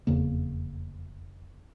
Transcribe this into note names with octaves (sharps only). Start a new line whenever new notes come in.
F1 E2 C#3 A#3